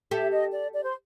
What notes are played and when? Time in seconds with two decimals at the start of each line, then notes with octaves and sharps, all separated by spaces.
0.11 G4 A4 E5
0.32 D#5
0.53 D5
0.73 D5
0.83 C5